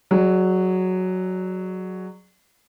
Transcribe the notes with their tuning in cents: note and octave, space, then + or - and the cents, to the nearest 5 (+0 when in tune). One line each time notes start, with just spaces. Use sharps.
F#3 +0 G#4 +0 D5 +30